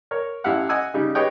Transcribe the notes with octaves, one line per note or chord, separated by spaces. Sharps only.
A#4 C#5
A1 E4 G4 F5 F#5
D#5 F#5 G#5 E6
C#3 G3 D#4
G4 G#4 B4 C#5 D#5 G5